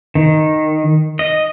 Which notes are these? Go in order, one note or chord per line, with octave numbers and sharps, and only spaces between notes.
D#3
D#5